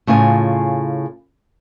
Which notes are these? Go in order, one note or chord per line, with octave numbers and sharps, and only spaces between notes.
A2 C#3 F4 G#5